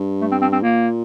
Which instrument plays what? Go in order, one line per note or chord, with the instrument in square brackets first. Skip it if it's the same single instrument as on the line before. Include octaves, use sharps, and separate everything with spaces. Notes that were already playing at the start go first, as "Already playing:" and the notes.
Already playing: [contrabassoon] G2
[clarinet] A3
C4
C4
C4
[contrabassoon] A#2 [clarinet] A#3